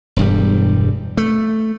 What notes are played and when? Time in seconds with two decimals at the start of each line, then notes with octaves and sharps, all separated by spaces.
0.16 E1 G2 G3
1.17 A3